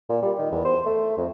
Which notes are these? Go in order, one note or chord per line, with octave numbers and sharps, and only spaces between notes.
A#2
G3
D#3
E2
C5
A3
F2